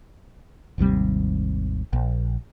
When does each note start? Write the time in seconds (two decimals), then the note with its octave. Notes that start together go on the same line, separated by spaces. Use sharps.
0.78 G#1 D#2 C3 G3
1.93 A#1